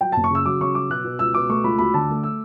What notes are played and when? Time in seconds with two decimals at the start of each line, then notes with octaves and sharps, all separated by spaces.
0.01 F#3 G5
0.12 F#1 A5
0.24 C#6
0.31 C#3 E6
0.46 F#3 D6
0.61 C#3 C#6
0.75 F#3 D6
0.90 B2 F#6
1.04 B2
1.19 C#2 E6
1.34 B2 D6
1.49 A3 C#6
1.64 C#2 B5
1.78 D2 B5
1.94 D3 A5
2.09 A3
2.23 E6